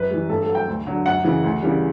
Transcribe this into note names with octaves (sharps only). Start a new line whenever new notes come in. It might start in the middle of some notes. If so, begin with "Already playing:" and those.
Already playing: F#2 B4
E3 G3
G2 A4
A4
F#3
G5
D2
D3 F#3
F#2 F#5
C#3 E3
D2
C#3 E3 G3